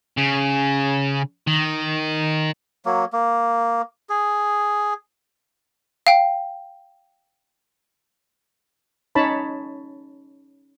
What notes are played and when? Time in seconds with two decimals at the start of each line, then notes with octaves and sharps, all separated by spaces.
0.17 C#3
1.47 D#3
2.86 F#3 A#3
3.13 A#3
4.10 G#4
6.07 F5 G5
9.15 C#4 D#4 C#5 A5 B5